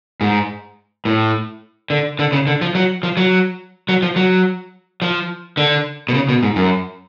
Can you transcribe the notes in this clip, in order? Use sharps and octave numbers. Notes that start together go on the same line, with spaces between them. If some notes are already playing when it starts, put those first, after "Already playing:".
G#2
A2
D3
D3
C#3
D3
F3
F#3
F3
F#3
F#3
F3
F#3
F3
D3
B2
C#3
B2
G#2
F#2